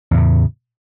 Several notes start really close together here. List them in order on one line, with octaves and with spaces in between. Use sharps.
E2 A2 C#3